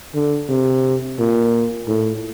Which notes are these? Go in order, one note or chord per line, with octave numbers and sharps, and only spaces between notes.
D3
C3
A#2
A2